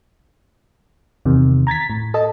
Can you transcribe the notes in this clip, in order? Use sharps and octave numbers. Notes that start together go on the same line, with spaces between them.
E2 C3 D#3
A#5 G#6 A6 B6
A2
A4 D#5 A5